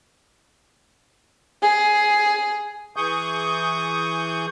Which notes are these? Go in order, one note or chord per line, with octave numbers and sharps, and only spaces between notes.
G#4
E3 G#4 C#6 D#6 G6